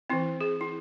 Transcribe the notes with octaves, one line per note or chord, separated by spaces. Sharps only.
E3 C4 E4
G#4
E4